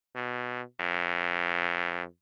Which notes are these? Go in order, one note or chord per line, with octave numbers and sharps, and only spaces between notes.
B2
F2